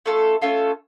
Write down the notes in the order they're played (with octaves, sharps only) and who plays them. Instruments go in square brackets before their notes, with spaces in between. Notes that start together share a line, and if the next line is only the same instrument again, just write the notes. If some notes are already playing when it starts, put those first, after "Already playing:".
[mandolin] A3 C#4 F4 A4
A3 C#4 F4 A4